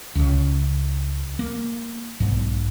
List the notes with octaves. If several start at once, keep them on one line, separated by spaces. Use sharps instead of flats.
C#2 C#3
A#3
B1 G#2